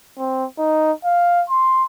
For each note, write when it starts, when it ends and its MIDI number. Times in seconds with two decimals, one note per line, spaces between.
0.18 0.46 60
0.59 0.92 63
1.04 1.43 77
1.50 1.84 84